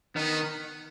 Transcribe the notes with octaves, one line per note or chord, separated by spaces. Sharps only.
D#3 B3